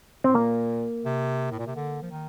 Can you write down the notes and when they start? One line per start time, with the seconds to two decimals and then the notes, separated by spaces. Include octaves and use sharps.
0.24 A2 C4
0.35 A#2 A#3
1.05 C3
1.51 A2
1.59 A#2
1.67 C3
1.76 D3
2.02 F3
2.11 D#3